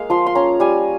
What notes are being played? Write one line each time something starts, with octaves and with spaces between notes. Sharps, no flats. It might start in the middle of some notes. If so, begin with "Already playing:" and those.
Already playing: G#3 A#3 F5
F3 C6
C6
C#4 A#5
G3 G#5